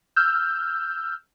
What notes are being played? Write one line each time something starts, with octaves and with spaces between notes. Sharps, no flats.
E6 F6 G6